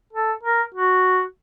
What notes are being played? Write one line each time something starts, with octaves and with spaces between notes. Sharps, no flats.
A4
A#4
F#4